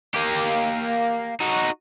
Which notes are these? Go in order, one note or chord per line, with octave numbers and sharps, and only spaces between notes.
A#3 G4
D#4 F#4